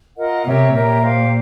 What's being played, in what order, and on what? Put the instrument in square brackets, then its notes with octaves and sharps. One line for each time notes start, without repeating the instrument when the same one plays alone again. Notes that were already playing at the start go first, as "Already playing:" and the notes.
[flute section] F4 A#4 D#5 F#5
[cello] C3 [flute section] G4 A#4 C#5 E5
[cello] A#2 [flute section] G4 A#4 C#5 E5
[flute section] G4 C5 F5